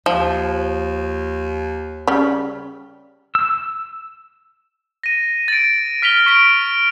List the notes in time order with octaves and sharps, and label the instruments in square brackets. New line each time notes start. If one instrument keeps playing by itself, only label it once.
[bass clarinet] D#2 [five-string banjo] F3
[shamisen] C#3 G3
[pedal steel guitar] E6
[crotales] A#6 D#7
A6 D7
F6 B6 F7 G7
C#6 B6 D7 G7